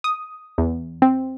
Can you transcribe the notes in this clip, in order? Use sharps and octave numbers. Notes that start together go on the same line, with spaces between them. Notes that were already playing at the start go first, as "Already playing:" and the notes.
D#6
E2
C4